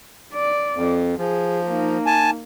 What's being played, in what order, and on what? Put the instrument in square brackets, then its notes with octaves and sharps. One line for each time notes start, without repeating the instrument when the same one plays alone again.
[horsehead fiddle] D5
[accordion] F2
[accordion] F3 [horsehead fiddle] G#4
[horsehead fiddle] A#3 D#4
[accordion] G#5 A5